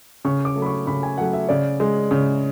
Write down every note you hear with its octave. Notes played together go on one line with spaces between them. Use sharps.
C#3 C#6
D6
F#3 A3
B5
C#6
C#3 B5
G#5
F#3 A3 F#5
E5
C#3 D5
G#3
C#3